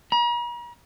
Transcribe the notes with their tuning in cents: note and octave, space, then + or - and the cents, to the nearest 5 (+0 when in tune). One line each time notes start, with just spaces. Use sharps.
A#5 +45